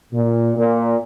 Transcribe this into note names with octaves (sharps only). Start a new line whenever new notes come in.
A#2
A#2